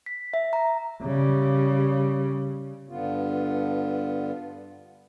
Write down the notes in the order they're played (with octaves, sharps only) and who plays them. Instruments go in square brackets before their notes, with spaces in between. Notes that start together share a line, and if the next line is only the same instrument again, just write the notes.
[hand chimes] B6
E5
A#5
[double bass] C#3 G3
[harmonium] G2 D3 B3 F4